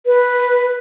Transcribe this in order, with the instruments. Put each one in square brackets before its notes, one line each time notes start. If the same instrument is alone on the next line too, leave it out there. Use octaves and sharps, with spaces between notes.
[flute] B4